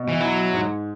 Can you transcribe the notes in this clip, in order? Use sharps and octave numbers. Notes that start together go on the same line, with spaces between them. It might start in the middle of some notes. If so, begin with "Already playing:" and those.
Already playing: B2
E3
F#3 E4
G#2